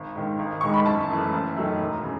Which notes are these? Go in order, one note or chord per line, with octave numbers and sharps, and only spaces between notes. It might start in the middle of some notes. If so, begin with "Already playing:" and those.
Already playing: G#1
G#2 D#3
G#1
G#2 D#3 G#3 C#6
B5
F#1 A5
F#2 E3 A3
F#1
F#2 D#3 F#3 A3
E1
C#3